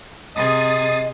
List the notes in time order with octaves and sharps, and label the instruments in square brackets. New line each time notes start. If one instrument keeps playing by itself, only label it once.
[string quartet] C3 G#4 [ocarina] D#5 [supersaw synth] D#6 A6 C7